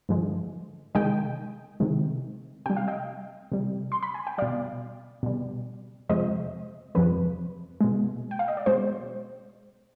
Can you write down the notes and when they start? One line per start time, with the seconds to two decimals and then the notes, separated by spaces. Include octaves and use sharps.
0.09 G2 D3 F3 G#3
0.95 C3 D#3 G#3 D#5 G5
1.80 C3 D#3 G#3
2.66 C3 G3 G5
2.77 F5
2.88 D#5 G5
3.52 C3 G3
3.92 C6
4.03 B5
4.14 G#5
4.27 G5
4.38 B2 G3 D5 F5
5.23 B2 G3
6.09 F2 C3 F3 G#3 C5 D#5
6.95 F2 C3 F3 G#3 B4
7.81 B2 G#3
8.31 G5
8.39 F5
8.48 D#5
8.57 D5
8.66 B2 G#3 C5